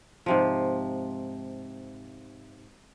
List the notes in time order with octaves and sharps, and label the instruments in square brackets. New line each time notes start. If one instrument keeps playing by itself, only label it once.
[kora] G#2 C3 F3